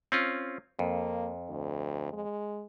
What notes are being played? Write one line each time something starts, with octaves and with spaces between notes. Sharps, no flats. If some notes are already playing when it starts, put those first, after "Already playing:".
C4 C#4 F4
F2 A#3
D2
G#3